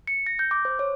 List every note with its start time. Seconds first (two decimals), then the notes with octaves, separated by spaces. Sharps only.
0.07 C#7
0.26 A#6
0.39 G6
0.51 D6
0.65 C5
0.79 C#5